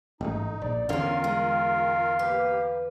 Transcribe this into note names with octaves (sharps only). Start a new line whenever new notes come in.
A1 G#2 A3 D#4
A#1 D5
E2 D3 D#3 C#4 D4 F4 A#4 F5
G#3
A#3 G4 B4